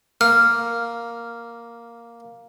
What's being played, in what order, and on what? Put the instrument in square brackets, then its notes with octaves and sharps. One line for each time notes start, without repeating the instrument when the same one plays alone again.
[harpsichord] A#3 [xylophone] F6